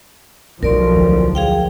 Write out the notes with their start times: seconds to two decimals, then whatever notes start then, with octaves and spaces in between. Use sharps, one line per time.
0.63 B1 F3 D#4 A#4 D5 C6
0.96 D2 E4
1.35 G#4 F5 G5